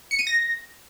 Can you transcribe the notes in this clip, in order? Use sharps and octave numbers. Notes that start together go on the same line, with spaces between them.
C#7
D#7
A#6